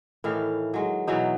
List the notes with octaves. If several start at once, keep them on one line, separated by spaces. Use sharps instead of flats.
A2 D#3 E3 F5
F#3 G#3
B2 E3 F#3 D#4